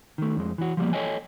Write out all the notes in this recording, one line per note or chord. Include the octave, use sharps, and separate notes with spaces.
D#3 A3
F2 G#3
E3 F#4
F3 G3 A#3
A4 B4 C#5 D#5 G5 G#5